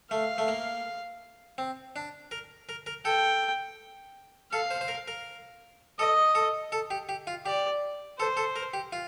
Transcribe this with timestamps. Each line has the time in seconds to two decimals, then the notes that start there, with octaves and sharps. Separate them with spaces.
0.11 A3 F5
0.38 A3
0.48 A#3
1.58 C4
1.96 D4
2.31 A#4
2.69 A#4
2.86 A#4
3.05 A4 G5
4.52 A4 F5
4.71 C5
4.81 C5
4.88 A#4
5.08 A#4
5.99 A4 D#5
6.35 A4
6.72 A4
6.91 G4
7.09 G4
7.27 F4
7.46 G4 D5
8.19 A4 C5
8.37 A4
8.56 A#4
8.74 G4
8.93 F4